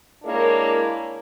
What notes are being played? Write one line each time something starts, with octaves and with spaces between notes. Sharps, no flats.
G#3 A#3 D4 E4 A#4 C#5